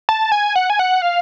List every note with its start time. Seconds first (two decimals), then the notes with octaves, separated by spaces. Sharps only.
0.09 A5
0.32 G#5
0.56 F#5
0.70 G#5
0.79 F#5
1.02 F5